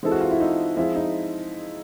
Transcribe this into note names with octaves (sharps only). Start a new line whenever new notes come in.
E3 G#3 C4 E4 A4
F#4
F4
E4
D#4
F3 G#3 C4 E4 F4 G#4
D#4